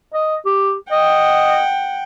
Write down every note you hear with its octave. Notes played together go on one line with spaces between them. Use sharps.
D#5
G4
D#5 F#5 G5